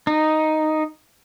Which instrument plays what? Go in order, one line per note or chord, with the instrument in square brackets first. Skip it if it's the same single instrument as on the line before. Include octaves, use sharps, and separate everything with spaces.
[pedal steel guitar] D#4